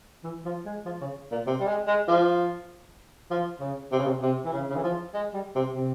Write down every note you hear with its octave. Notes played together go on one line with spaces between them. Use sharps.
E3
F3
G#3
F3
C#3
A#2
C3
G3
G#3
G#3
F3
F3
C#3
C3
C#3
C3
C3
E3
C#3
C#3
E3
F3
G#3
G3
C3
C3